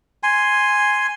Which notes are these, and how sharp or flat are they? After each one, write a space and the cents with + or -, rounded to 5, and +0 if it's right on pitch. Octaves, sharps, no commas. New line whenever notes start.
G#5 +0 C6 +0